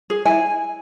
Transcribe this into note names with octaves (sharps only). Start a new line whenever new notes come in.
G#4
E4 G#5